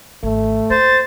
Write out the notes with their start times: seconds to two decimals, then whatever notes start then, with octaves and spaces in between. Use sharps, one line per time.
0.23 G#1 A3
0.70 A#3 C5 A6